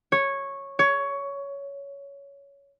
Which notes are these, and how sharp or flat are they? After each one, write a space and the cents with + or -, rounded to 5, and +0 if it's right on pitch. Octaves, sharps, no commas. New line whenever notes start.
C#5 -10
C#5 +15